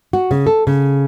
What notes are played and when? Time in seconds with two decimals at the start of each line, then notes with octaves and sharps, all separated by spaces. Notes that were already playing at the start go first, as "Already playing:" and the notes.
0.13 F#4
0.31 C#3
0.47 A4
0.67 C#3